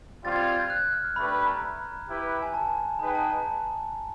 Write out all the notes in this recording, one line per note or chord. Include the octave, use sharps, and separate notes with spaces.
G3 C4 F4 A6
G#6
A6
G#6
A6
G6
F#6
F#6
F6
F6
A3 D4 G4 B4 B5
B5
A#5
E4 G4 B4
G#5
A5
D#4 G#4 B4 D#5 G5 A#5
A5
A5